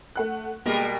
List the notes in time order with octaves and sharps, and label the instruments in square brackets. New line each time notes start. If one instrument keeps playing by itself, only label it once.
[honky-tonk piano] A3 F#5 F#6
[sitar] B2 G3 A#4 [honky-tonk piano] G#3 A#3